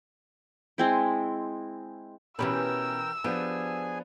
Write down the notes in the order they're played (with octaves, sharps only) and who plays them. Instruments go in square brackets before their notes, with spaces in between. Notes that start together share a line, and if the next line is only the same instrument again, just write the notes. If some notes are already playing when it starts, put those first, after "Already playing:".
[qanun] G#3 C4 E4
[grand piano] B2 C#4 [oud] E3 G4 B4 [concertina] A#4 G5 [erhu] E6
[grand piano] F3 B3 D4 [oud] G4 [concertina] G#4 G#5